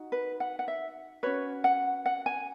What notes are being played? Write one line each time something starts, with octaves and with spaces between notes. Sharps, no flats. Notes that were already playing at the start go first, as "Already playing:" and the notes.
Already playing: D#4 F#4
B4
F#5
F#5
E5
C#4 F#4 B4 C#5
F#5
F#5
G#5